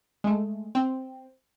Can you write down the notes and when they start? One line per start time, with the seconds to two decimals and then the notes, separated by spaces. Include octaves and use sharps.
0.24 G#3 A3
0.75 C4